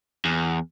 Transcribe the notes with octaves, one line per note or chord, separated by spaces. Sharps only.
E2